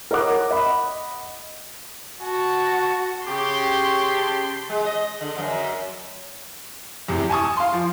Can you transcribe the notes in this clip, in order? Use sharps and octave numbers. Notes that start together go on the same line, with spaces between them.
A#4 C#5 D#5 F#5 D6 F#6
D#5 F#5 B5
F#4 A5
C#3 C#4 G4 C6 C#6
A5
G#3
D#5
D3
F#2
E2 A2 C3
G#5 A5 C#6 D#6
F5 C6
F3